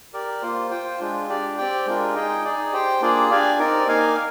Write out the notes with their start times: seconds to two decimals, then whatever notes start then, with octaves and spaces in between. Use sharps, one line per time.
0.13 G4 A#4 D5
0.42 A#3 F4 C5
0.71 F4 C5 G5
1.00 G#3 D4 F4
1.29 D4 G4 D5
1.58 C4 G4 D5 G5
1.86 G#3 D4 F4 A#4
2.15 D#4 G#4 D#5 G5
2.44 D#4 G#4 D5
2.73 G4 C5 G5
3.01 A#3 D4 F4 G#4 D5
3.30 D4 G4 D5 F5 G#5
3.59 C4 D#4 A#4 D5
3.87 A#3 D#4 A#4 F5 G#5